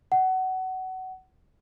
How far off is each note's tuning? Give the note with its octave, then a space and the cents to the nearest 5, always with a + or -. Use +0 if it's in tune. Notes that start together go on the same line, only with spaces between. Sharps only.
F#5 +20